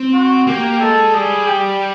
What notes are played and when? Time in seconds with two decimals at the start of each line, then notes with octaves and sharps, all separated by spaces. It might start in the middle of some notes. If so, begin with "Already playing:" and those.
Already playing: C4
0.13 F#4
0.47 A#3 G4
0.80 G#3 A4
1.14 G3 G#4
1.47 G4